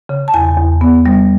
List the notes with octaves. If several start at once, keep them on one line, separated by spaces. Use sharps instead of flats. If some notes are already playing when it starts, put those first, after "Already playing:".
C#3
A5
E2 G#5
E2
B3
G3